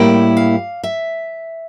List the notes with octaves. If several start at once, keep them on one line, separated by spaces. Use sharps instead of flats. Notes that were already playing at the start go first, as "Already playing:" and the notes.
Already playing: A2 G3 A#3 E4 G5
F5
E5